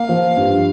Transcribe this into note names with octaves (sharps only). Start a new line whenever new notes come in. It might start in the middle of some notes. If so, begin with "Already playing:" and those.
Already playing: A#3 F5
F3
G2